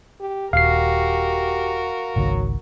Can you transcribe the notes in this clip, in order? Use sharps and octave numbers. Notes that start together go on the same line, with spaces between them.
G4
D#1 F#4 G4 A#4 F5 C7
G#1 C#2 D#3 F#3